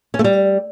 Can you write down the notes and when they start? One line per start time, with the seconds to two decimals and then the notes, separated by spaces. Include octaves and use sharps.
0.14 C#4
0.19 A3
0.24 G3